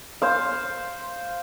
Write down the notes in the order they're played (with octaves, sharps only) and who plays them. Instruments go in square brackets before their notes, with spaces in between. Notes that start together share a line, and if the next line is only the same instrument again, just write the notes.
[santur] C5 F5